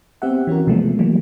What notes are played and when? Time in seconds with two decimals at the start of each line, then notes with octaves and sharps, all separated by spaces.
0.22 B3 C4 G4 E5 F#5
0.47 E3 C#4 F#4 A#4
0.67 C3 F3 G#3 A3 B3
0.99 E3 F#3 G3 A3 A#3